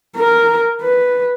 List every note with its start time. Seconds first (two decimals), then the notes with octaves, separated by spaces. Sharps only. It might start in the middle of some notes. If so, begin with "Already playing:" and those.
0.17 A#4
0.82 B4